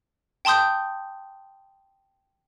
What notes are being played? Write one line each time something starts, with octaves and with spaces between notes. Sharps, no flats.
G5 A5 C6 D#6 G6